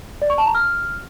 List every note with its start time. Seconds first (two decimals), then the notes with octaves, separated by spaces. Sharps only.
0.22 D5
0.30 C#6
0.38 A5
0.46 A#5
0.55 F6